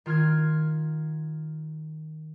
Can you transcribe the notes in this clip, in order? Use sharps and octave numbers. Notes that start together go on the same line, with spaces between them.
D#3 F4 F6 G#6